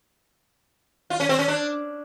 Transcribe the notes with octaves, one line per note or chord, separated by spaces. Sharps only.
F4
C#4
C4
C#4
D4